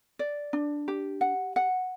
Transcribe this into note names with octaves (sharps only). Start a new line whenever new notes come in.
D5
D4
G4
F#5
F#5